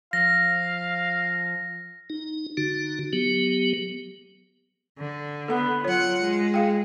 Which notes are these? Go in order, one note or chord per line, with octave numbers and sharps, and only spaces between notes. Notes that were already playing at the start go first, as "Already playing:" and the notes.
F3 F5 A#6
D#4
D3 D#4 F#4
F#3 B3 G4
D3
B3 A4 F#5
F#3 F4 C#5 F#5
G#3
G#4 F5 G5